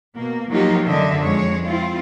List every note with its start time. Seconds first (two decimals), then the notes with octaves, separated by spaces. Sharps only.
0.16 B2 A#3
0.49 F3 F#3 A#3 D#4 F4 G4
0.87 F#2 D3 D#5 E5
1.22 F2 G#3 C#5
1.65 C4 E4 F4